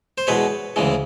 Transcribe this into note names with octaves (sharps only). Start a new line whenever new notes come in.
C5
E2 B2 G#3 B4 C#5
D2 C#3 E3 G#3